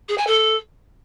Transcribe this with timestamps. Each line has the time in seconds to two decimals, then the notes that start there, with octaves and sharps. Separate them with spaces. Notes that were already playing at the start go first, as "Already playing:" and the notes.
0.08 G#4
0.18 G#5
0.27 A4